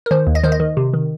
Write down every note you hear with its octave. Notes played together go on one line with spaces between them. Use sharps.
A#4
D#3 C5
D#2
D#5
D#3 C5
D#5
D#3
C3
D#3